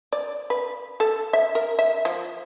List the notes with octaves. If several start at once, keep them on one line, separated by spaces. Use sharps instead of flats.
D5
B4
A4
E5
A#4
E5
F3